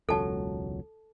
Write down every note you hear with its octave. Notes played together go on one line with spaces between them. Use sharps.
E1 C#2 F#3 A4 A5